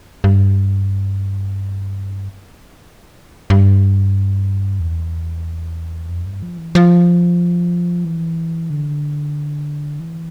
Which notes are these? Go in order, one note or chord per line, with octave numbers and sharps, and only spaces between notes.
G2
G2
E2
F2
G2
F3
E3
F3
E3
D3
E3